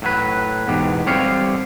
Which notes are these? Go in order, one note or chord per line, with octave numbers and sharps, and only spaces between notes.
A2 F#3 B4
E2 G#2 B2 G4
D3 G3 C4 G4 C#5 F5